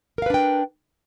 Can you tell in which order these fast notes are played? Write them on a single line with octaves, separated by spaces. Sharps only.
A#4 F5 B4 D4 G5